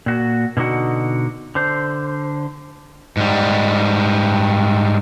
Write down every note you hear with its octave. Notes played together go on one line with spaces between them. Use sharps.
A#2 F#4
B2 D3 D#4 F#4 F#5
D3 C5
G#2 G3